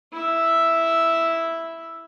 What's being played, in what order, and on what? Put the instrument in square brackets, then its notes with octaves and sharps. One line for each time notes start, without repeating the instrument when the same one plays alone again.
[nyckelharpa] E4 E5